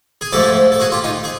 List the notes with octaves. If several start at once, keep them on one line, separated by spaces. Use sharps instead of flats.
G#4
G#2 F3 A3 G4 A4
A4
F#4 G#4
F4 G4
D#4 F4
G#4